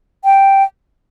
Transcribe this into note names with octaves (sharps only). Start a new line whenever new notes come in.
G5